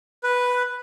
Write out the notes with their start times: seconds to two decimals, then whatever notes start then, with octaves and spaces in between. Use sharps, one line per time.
0.23 B4